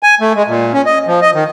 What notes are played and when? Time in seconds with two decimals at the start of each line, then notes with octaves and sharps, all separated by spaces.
0.03 G#5
0.21 A3
0.36 G#3
0.47 A#2
0.73 C#4
0.86 D#5
1.07 F3
1.22 D#5
1.34 D#3